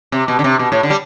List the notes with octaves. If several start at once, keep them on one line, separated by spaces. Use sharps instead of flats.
C3
B2
D3
C3
B2
A2
D3
G3